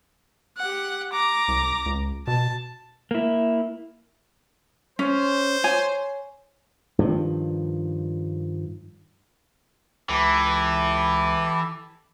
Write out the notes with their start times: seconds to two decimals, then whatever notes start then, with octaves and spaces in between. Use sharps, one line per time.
0.58 G4 F#5
1.13 A#5 D6
1.48 C2
1.86 C#2
2.27 B2 A5
3.11 A#3 E4
4.99 C#4 C5
5.64 C#5 G#5
6.99 G2 D#3 F3
10.09 C#2 E3 E4 G4 A4